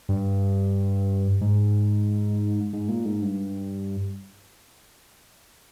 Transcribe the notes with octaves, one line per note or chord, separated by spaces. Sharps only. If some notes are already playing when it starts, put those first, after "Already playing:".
G2
G#2
G#2
A#2
G#2
G2